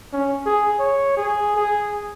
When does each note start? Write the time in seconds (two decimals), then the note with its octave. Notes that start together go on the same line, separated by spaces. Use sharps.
0.13 C#4
0.46 G#4
0.80 C#5
1.17 G#4
1.57 G#4